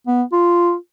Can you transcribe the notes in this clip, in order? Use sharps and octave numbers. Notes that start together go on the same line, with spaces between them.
B3
F4